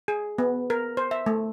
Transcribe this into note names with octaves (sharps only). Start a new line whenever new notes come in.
G#4
B3
A#4
C5
E5
A3